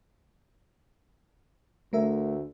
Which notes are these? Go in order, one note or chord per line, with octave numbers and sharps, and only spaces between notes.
D2 A3 A#4 E5